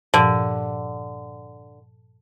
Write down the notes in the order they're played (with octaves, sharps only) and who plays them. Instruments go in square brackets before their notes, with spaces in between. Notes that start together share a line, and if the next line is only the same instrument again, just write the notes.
[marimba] G2 A#2 F3 [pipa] D3